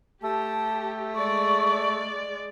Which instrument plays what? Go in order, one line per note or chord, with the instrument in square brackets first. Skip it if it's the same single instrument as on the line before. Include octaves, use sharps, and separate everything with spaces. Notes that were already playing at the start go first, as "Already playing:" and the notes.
[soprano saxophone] A3 [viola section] G4 [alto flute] A5
[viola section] G#3 D5 [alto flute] C#6